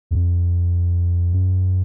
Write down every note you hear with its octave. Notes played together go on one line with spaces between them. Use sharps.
E2
F2
F#2